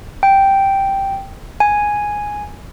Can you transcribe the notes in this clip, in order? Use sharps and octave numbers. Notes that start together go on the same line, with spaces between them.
G5
G#5